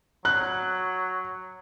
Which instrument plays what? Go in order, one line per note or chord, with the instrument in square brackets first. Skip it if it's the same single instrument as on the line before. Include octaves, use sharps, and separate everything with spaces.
[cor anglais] F#3 [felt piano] F#6